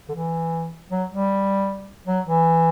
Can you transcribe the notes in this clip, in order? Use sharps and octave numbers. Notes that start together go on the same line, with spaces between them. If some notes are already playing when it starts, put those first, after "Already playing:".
D3
E3
F#3
G3
F#3
E3